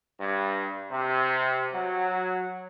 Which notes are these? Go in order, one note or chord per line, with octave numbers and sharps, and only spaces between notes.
G2
C3
F#3